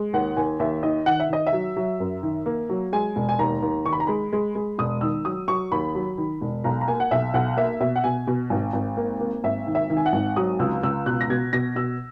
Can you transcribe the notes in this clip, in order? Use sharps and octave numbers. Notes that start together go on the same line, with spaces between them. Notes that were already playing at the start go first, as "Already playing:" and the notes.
Already playing: G#3
D#2 F#5
D#2 G#5
D#2 E5
D#3 D#5
D#3 F#5
E5
D#3 D#5
E5
F#3
F#3
F#2
D#3
A#3
F#3
G#3 G#5
E1
G#5
D#2 A#5
D#2
D#3 C#6
B5
A#5
G#3 B5
G#3
G#3
E1 D#6
D#3 E6
F#3 D#6
F#3 C#6
D#2 B5
F#3
D#3
E1
B1 A#5
A#5
A#3 G#5
F#5
B1 E5
B1 F#5
A#3 E5
B2 E5
F#5
B2 G#5
B2
G#1
G#1
A#3
A#3
G#1 E5
D#3
E5
D#3
G#5
F#5
G#1
F#3 D#6
C#2 E6
C#2 E6
B2 F#6
A#6
B2 G#6
B2 A#6
B2 E6